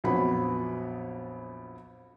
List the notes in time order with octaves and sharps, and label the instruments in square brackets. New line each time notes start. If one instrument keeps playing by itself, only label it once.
[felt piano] A#1 F2 F#3 B3 B5